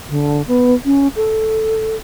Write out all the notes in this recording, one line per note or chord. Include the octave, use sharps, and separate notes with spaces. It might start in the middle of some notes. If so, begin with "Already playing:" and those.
D3
B3
C#4
A4